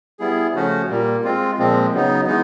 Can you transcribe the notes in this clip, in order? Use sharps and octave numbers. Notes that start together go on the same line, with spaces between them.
G3 B3 E4 G#4
C#3 F3 A3 C#4 F#4
A#2 G3 A#3
G#3 C4 F4
A#2 F3 G#3 C4
C#3 F#3 B3 D#4
E3 G#3 B3 D#4